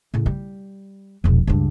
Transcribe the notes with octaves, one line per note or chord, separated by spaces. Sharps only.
A2 C#3
G3
E1 A#1
C#2 G2